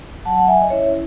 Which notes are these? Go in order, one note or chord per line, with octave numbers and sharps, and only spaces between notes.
F#3 F#5 A5
F#5
E5 G#5
D#5
C#4 E4 C#5 E5